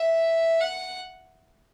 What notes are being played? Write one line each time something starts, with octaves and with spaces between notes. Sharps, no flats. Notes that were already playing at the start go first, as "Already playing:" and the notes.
Already playing: E5
F#5